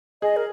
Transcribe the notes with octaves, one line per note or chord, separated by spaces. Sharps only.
G#4 D#5
A#4